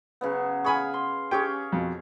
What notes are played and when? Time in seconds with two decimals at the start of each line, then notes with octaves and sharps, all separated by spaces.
0.21 C#3 F#3 B3
0.64 G#4 F5 G#5 B5 C#6
0.94 C6
1.31 C#4 G4 G#4 C#5 G5
1.72 F2 B2